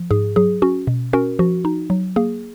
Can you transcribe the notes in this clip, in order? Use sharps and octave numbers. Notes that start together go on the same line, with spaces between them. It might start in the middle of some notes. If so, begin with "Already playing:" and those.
Already playing: F3
G#2 G#4
F#3 G#4
C#4 F#4
B2
C#4 F#4 A#4
F3 F#4
D#4
F#3
A#3 G#4